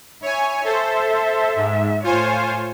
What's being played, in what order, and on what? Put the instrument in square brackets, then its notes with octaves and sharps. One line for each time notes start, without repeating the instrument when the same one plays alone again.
[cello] E4 [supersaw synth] C#5 G#5
[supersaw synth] A4 C5 [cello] E5
[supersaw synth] G#2
[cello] A2 C#5 [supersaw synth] F4 C5 G#5